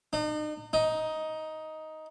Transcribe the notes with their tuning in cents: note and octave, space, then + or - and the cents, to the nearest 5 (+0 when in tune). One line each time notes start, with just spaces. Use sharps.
D#4 -40
D#4 +10